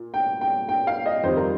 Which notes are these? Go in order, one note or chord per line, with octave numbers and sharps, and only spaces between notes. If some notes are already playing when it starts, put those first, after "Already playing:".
Already playing: A#2
G5
G5
G5
F5
D#5
F2 D#3 G3 C5
A#4